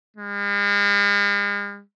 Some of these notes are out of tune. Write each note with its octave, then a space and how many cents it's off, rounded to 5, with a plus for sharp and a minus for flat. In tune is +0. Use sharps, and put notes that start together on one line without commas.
G#3 -45